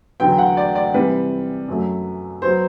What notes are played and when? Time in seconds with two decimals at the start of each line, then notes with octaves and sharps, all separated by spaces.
0.20 E2 D3 F#3 B3 G5
0.38 F#5
0.57 D5
0.75 D5
0.94 C3 E3 G3 B4
1.68 F#2 F#3 A3
2.42 F#3 B3 C5